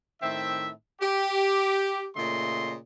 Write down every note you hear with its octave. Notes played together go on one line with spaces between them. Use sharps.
A2 D#3 C4 E5
G4
A#2 C#3 A3 D#5 C6